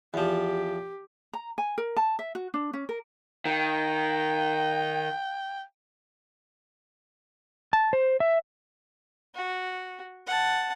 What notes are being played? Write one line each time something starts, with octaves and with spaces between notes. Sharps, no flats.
E2 F3 G4
A#5
G#5
A#4
A5
E5
F#4
D4
C#4
A#4
D#3 G5
A5
C5
E5
F#4
F#5 A5